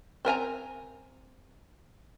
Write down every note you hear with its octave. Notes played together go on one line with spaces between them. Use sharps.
C4 A#4 G#5 A#5